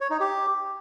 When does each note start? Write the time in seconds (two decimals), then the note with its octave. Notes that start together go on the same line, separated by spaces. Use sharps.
0.01 C#5
0.10 D#4
0.20 G4